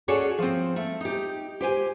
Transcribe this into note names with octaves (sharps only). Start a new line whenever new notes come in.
C#4 F#4 G#4 A4 C#5 D5
F3 C4
A3
D#4 G4
G4 C5 G#5